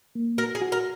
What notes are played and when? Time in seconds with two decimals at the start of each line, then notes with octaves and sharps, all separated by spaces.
0.15 A#3
0.38 F#4 A#4
0.55 G#4
0.62 F#4
0.72 A#4